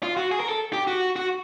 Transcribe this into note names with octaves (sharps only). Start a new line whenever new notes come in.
F4
F#4
G#4
A#4
A4
G4
F#4
F#4